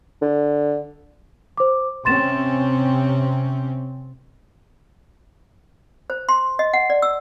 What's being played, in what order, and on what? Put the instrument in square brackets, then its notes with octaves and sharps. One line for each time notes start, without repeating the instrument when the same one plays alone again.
[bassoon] D3
[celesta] C5 D6
[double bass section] C3 C4 C#4 [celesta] C6 A6 E7
[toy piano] C5
C6
D#5
F#5
D5
E6